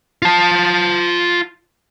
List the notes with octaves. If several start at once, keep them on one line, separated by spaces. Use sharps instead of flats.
F4 A5